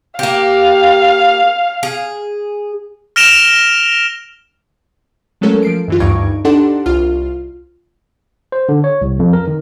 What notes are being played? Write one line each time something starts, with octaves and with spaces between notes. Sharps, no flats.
A#3 G4 F5
G#4
F6 A#6 D7 E7 F7 G7
F#3 G#3 A3 C#4 A4 A#4
F3 C7 D7
F#2 E3 F4
D2 G2 D#4 C#6 G#6 D7
D4 D#4 G4 A4 F#5 C6
C2 F4 F6
C5
D3
C#5
C2
F2
A#4
D#3